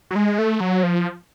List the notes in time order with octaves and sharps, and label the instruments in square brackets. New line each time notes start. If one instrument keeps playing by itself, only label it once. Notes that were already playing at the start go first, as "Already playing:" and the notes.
[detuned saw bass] F#3
G#3
A3
F#3
F3